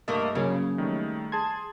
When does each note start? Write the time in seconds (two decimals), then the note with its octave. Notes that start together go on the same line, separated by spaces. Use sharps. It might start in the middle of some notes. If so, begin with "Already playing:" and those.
0.08 G2 A3 A#3 A#4 D#5
0.35 C#3 F#3 A#3 C#4
0.78 D#3 G3 A3
1.32 G#4 A5 C6 G#6